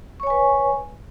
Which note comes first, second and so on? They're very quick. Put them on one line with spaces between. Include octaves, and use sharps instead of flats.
C#6 C#5 G#5 B4